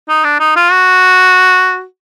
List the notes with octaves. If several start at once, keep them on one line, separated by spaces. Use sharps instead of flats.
D#4
D4
D#4
F4
F#4